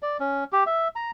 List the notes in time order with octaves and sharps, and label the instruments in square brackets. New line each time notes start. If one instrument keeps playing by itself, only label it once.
[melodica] D5
C#4
G4
E5
A#5